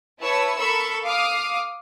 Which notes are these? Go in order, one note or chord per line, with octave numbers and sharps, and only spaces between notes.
E4 B4 C#5 A5 E6
A4 A#4 B5 C#6 E6
F5 D6 D#6 F6